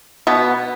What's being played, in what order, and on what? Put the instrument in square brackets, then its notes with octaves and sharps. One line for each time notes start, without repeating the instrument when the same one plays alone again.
[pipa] B2 B3